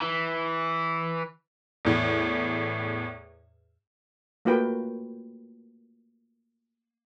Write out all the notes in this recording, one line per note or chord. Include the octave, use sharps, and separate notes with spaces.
E3
E2 A2
A3 A#3 F4 F#4 B4 G5